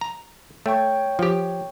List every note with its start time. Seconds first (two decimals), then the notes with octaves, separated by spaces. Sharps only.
0.01 A#5
0.66 A3 C#5 G5 C#6
1.19 F3 G4